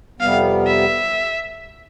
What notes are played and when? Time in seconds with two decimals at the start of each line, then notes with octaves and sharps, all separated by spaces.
0.20 F2 C3 G3 B3 F5
0.67 E5